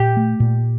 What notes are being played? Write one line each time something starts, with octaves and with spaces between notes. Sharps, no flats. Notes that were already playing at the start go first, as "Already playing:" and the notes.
Already playing: A#2 G4
A3
A#2